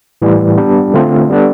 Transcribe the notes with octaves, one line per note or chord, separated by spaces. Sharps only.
A2 E3 G3
G3 B3 D4
D3 A3 C4 F4 A4
G3 B3 D4 A4